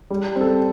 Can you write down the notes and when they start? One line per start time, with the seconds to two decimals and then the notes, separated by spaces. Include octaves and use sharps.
0.10 G3
0.36 C4 A4